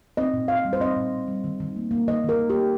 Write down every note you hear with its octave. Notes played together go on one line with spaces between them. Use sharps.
C4 D#5
A#2
A#2 F5
G3
C5
C4 D#5
A#2
A#2
G3
D#3
D#3
A#3
A#3
D#3 D#5
D#3 A#4
A#3
G4
A#3